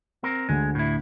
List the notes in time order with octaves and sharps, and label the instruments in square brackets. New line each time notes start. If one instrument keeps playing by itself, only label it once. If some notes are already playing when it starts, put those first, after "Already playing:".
[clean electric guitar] C4 A#4
[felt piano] D2 D3 [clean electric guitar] G#3
[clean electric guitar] A2 E4